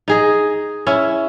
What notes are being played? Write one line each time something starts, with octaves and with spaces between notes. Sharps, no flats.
D#4 G#4 D#5
C#4 E4